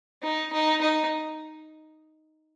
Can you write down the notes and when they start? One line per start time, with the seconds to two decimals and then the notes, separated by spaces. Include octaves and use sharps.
0.23 D#4
0.53 D#4
0.81 D#4